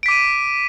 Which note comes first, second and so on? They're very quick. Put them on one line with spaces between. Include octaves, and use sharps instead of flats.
D7 B6 D6 D#7